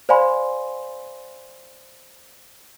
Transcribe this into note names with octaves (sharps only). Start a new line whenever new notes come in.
C5 D5 F5 G#5 B5 C6